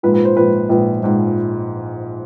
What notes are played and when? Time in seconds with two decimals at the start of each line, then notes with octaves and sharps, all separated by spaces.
0.03 A#1 G#2 F3 B4
0.14 B4
0.25 C5
0.37 A#1 G#2 F3 B4
0.69 A#1 G#2 F3 B4
1.02 A#1 G#2 F3